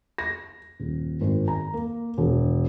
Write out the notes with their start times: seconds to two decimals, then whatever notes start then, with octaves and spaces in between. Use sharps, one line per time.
0.18 A#6
0.80 D#1
1.21 G#1
1.48 A#5
1.74 A#3
2.18 E1